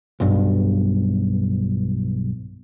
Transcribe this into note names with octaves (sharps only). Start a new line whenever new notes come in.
B1 G2